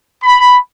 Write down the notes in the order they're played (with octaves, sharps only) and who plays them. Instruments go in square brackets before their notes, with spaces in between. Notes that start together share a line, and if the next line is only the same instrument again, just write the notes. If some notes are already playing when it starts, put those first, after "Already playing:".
[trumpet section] B5